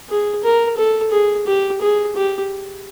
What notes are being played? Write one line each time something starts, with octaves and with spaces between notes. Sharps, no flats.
G#4
A#4
A4
G#4
G4
G#4
G4